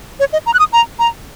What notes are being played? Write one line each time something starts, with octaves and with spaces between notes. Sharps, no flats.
C#5
D#5
A#5
F#6
D#6
A#5
A#5